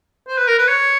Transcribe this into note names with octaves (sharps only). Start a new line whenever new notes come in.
C5
B4
A#4
B4
C#5